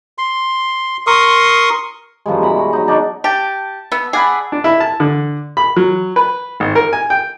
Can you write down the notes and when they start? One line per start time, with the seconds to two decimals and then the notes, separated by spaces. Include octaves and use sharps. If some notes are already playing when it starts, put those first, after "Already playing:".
0.18 C6
1.07 A#4 C6 C#6 D#6
2.26 F#2 F3 G3 G#3
2.41 B2 E3 A#5 B5
2.57 F#4
2.73 F#3 D#4
2.88 D4 D#4 C#5 D5
3.24 G4 A5
3.92 B3 E6
4.13 G#4 D5 F#5 B5
4.52 D4
4.64 E4
4.80 A5
5.00 D3
5.57 B5
5.76 F#3
6.16 B4
6.60 G#1
6.75 A#4
6.93 G#5
7.10 G5